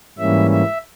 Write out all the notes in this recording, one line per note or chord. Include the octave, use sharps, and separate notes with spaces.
G#2 E3 G3 A#3 C#4 E5
E5